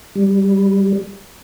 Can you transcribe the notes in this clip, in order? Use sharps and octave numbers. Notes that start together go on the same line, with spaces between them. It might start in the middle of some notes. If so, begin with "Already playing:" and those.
G3